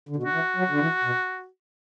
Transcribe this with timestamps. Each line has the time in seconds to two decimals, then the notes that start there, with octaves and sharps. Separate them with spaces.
0.09 D3
0.16 B2
0.23 D3 F#4
0.33 E3
0.56 F#3
0.69 D3
0.80 E3
1.04 B2